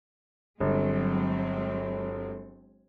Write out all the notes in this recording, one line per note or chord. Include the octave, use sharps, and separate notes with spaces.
G1 F#3 G#3 C4